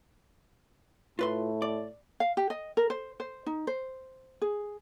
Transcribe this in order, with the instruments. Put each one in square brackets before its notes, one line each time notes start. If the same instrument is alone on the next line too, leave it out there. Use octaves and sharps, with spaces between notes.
[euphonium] A2 [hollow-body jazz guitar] F4 B4 C6
[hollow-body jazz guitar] D5
[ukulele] F5
G4
D#5
A#4
C5
C5
D#4
C5
G#4